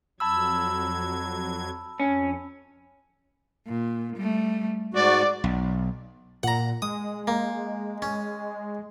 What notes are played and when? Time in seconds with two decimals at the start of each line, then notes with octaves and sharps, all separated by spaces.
0.20 F2 F#3 A5 B5 E6 G#6
2.00 F2 C#4
3.67 A#2
4.16 G3 A3
4.94 G#2 G#3 F#4 D5
5.44 B1
6.43 A#2 F#5 A#5
6.82 G#3 D#6
7.27 A#3
8.02 C#4